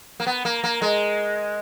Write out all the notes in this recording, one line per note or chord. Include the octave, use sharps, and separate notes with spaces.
A#3
B3
A#3
A#3
G#3